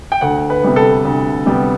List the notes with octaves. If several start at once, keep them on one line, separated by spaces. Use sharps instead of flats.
G5
D2 F#5
B4
C3 G3 B3
A4
D2
C3 G3 B3